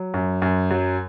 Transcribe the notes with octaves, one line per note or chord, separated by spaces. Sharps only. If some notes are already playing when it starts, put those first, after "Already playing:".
Already playing: F#3
F#2
F#2
F#3